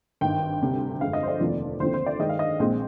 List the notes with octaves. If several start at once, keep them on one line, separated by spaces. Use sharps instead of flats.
G#1 G2 D#3 G5
D2 C3 G3
G1 F2 D3 G#3 F5
D#5
C5
D5
F1 D#2 D3 F3 C4
D#2 D3 F3 C4 C5
C5
D5
G2 D#3 G#3 D#5
F5
D#5
A#1 A#2 G#3 C4